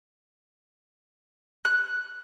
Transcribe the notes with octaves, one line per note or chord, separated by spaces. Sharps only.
F#6